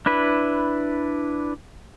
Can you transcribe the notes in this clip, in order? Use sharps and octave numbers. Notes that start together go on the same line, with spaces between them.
D4 E4 B4